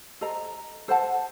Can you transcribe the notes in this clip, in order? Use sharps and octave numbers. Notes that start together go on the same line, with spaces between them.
A4 C5 D#5 A#5
A4 C5 F#5 A5